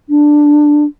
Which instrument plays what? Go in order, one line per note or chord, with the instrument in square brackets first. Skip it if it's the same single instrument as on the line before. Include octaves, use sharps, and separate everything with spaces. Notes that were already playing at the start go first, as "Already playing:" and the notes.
[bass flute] D4